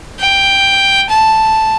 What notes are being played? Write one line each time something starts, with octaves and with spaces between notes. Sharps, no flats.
G5
A5